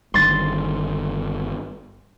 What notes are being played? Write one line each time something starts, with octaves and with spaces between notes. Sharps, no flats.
G1 G2 D#3 C6 A6 C7